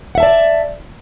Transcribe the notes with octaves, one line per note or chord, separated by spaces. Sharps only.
D5 E5 F#5 A5